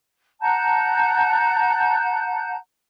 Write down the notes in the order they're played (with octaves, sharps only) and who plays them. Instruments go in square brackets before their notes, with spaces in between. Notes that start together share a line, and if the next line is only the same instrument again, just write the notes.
[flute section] F#5 A5 A#5 G6